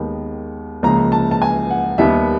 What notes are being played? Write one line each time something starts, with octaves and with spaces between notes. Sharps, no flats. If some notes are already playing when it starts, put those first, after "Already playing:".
Already playing: D#2 D#3 G#3 B3
C#2 C#3 F3 A#3 A#5
A5
A5
G#5
F#5
D#2 D#3 G3 B3 E5